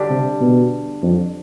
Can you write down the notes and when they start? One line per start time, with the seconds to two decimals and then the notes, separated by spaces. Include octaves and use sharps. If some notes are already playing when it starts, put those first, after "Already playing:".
Already playing: D3 G3 D4 G4
0.10 C3
0.41 B2
1.03 F2